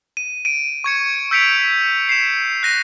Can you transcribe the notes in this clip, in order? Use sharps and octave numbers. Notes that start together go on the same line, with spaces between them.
D#7
D7 D#7
C#6 G#6 C#7
E6 G6 B6 C#7 D7 F7
C7 E7
F#6 A#6 D#7